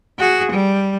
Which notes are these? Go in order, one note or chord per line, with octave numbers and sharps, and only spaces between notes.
F#4 G#4
G3